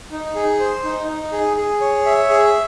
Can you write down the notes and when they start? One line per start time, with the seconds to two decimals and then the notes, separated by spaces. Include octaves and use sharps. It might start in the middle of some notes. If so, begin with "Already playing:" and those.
0.11 D#4
0.35 G#4
0.60 C5
0.84 D#4
1.08 D#4
1.32 G#4
1.57 G#4
1.81 C#5
2.06 E5
2.29 G#4